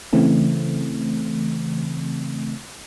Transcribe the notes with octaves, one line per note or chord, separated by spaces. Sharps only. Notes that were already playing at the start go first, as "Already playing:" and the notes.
C#3 E3 A3 C4